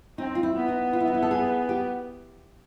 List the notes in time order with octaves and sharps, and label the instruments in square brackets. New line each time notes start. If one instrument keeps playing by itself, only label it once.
[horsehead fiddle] C4 [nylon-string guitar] D#4
[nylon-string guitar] F4
E4
[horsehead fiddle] B3
[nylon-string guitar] D#4
F4
E4
D#4
E4
A4
G#4
G4